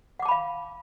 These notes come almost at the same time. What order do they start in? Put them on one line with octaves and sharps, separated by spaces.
F#5 D6 A5 B5 F5